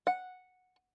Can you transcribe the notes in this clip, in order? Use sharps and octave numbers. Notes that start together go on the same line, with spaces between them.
F#5